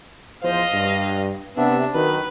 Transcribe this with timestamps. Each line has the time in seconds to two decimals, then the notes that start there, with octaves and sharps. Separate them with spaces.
0.43 E2 F3 C5 D#5 F5
0.73 G2
1.57 C3 B3 D4 E5
1.94 D#3 F#3 B4